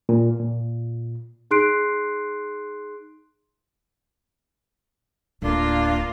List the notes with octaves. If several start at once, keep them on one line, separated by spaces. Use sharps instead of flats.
A#2
A#2
D#4 G#4 C6 F#6 C7 D7
D1 A#3 D4 F4